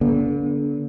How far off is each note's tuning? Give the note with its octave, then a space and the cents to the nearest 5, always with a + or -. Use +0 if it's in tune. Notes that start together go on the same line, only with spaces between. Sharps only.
D3 -35 A#3 +45